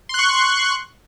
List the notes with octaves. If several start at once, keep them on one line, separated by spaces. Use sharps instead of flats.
C6 C#6 F#6